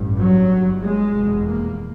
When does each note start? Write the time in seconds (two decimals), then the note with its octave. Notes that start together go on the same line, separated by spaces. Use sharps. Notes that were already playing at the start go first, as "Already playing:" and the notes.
Already playing: A1 G2
0.19 F#3
0.50 G1 G2
0.82 G#3
1.14 F1 E2 B2
1.46 A#3